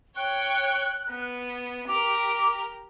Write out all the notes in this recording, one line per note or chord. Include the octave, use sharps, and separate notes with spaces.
C#5 G5 C#6 F#6
B3
G4 A#4 D6 F7